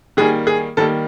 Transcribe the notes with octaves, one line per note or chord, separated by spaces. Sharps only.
D#3 G3 A#3 G#4
G#4
D#3 G3 A#3 A4